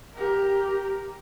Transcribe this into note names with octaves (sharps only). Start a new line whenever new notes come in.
G4 A#4